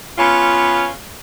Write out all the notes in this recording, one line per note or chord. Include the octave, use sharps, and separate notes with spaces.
B3 C#4 F4